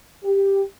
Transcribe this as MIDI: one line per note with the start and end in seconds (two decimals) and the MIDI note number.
0.24 0.61 67